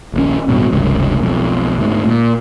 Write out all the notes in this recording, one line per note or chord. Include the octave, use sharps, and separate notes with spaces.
D#1 A#1 C#4
D1 G2 B2
F1 C#2 G2 C#3
B1 F2
D2 G#2
A#2